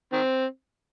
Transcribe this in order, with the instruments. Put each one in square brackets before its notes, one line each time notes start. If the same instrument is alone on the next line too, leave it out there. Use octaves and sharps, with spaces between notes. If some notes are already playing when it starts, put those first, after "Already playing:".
[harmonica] D#3 C4